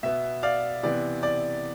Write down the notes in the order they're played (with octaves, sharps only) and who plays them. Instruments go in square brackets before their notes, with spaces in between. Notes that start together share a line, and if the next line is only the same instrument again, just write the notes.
[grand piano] B2 B3 E5
D5 F5
C3 E3 B3 D5
D5